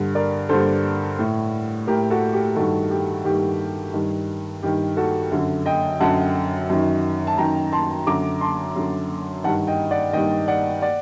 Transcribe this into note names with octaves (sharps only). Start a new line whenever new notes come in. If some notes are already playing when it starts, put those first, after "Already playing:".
Already playing: G2 D3
A#4 D5
G2 D3 A4 C5
A2
A2 G4 A#4
F#4 A4
G4
G2 D#3 F#4 A4
G4
G2 D#3 G4
G2 D#3
G2 D#3 G4
F#4 A4
F#2 D3
D#5 G5
F#2 D3 F#5 A5
F#2 D#3
A5
F#2 D#3 G5 A#5
A5 C6
F#2 D3 A#5 D6
A5 C6
F#2 D3
G2 D#3 F#5 A5
D#5 G5
D5 F#5
G2 D#3 D#5 G5
D5 F#5
D5 F#5